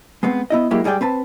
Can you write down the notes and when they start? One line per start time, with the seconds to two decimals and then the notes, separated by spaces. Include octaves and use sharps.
0.23 G#3 B3 C4
0.50 B3 E4 D#5
0.71 F#3 G#3 A#3 E4 G4
0.84 G#2 G3 G#4 D5 G5
1.01 C4 B4 A5